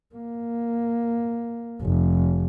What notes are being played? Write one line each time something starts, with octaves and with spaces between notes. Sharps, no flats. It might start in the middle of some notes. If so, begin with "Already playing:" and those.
A#3
F1